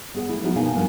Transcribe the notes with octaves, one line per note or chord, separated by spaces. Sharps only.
B3 G#4 F#5
A3 E4
F3 B3 D#4 E4 F#4 G#4
B2 A#3 D#4 F5 G#5
G2 A#2 F3 A#3 B3